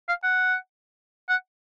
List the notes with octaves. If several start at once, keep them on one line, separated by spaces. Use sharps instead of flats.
F5
F#5
F#5